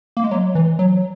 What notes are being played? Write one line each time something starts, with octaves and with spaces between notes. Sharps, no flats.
A#3
G#3
F#3
E3
F#3